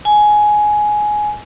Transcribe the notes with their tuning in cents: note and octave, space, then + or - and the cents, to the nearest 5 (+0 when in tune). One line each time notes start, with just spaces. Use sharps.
G#5 +10